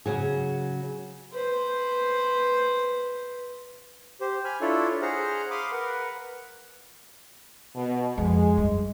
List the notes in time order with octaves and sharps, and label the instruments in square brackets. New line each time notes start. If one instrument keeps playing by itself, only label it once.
[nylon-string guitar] C#3 F#3 G#4
[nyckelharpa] B4 C5
[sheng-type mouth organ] G4 C5
G#5 B5 F6
D4 E4 F4 A4 C#5
G#4 C5 F#5 A#5 F6
F5 B5 C6 D6 D#6 F6
A#4 B4 F#5
[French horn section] B2
[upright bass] F2 [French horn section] G#3
[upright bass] G2